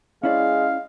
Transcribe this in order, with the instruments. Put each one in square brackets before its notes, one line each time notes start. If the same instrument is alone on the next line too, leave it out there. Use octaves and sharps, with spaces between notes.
[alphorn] G#3 [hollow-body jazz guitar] C#4 E4 D5 [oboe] F5